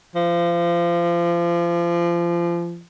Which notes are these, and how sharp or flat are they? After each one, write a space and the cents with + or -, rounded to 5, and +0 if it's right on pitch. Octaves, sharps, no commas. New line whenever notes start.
F3 -30